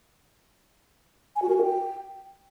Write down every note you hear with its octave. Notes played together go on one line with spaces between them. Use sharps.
G#5
F#4
A#4
F#4
G5